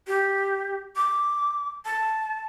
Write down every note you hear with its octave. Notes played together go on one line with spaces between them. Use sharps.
G4
D6
A5